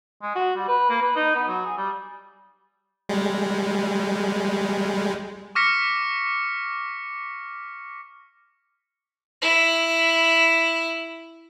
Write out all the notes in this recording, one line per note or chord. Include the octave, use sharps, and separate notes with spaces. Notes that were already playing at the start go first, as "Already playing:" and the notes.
G#3
F#4
G3
B4
A#3
B4
D#4
B3
F#3
G#4
G3
G3 G#3
C#6 D6 F6 A#6 B6 C#7
E4 B5